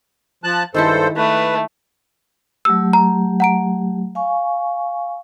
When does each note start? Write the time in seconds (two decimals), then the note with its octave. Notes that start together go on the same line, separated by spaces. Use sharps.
0.44 F3 A5 F#6
0.74 G2 D#3 G#3 E4 A4 C5
1.16 A3 B4
2.65 F#3 A3 G4 E6
2.93 A#5
3.40 F#5 A#5 D7
4.15 F5 G#5 C#6